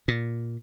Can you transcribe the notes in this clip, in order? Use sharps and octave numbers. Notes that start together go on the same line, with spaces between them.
A#2